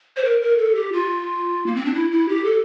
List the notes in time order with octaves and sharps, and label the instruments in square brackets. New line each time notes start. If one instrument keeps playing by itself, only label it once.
[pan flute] C5
A#4
A#4
A4
G4
F4
A#3
C4
D4
E4
E4
G4
A4